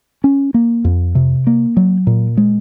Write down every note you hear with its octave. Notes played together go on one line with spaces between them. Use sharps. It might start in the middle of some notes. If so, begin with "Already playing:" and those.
C#4
A#3
F2
C3
A#3
F#3
A#2
G#3